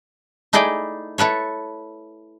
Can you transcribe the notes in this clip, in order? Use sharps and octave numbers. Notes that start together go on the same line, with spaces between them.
A3 D#4 E4 G#4 D5 G5
E4 A4 B4 C#5